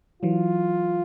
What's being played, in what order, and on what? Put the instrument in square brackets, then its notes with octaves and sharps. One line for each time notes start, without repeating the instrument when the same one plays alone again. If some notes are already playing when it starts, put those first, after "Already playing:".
[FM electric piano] E3 F#3 [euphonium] F4